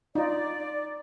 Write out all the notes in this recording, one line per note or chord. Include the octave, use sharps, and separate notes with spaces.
D#4 F4 D5